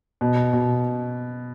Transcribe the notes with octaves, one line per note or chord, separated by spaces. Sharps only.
B2
B2